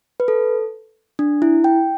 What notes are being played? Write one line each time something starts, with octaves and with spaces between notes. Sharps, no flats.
B4
A4
D4
E4
G5